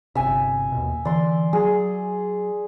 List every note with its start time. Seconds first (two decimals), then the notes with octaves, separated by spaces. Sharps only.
0.15 G1 C3 E5 G#5
0.72 D#2 B2
1.05 D3 E3 D5 C6
1.53 F#3 G#4